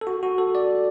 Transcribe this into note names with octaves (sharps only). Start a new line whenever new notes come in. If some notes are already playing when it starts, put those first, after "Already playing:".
A4
F#4
F#4
A4
D5